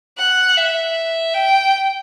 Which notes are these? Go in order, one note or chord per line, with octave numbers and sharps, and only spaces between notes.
F#5
E5
G5